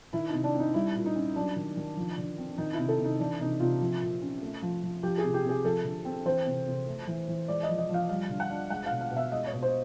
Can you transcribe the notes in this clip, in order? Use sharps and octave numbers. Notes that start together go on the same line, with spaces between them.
D#3 E4
C3 D#4
D4
C4
D#4
G3 E4
A#2
D#4
C#4
F#3 D4
D#3
D#3
F3
D3
C4
D#3 D#4
E4
C3
A4
C3
D#4
E3 D4
C3 D#4
C3 F4
F3
A#2
C#4
A3
F3
F3
F3 G4
G#4
C3
G4
C3
G#4
F3 A4
D3
C4
E3 C5
C3
C3
A3
E3
E3
G#3 D5
D#5
F3
D#5
F3
F5
G3 F5
D3
F#5
D4
G#3 F#5
B2 F5
F5
B2
E5
G#3 D#5
C#5
B2
C5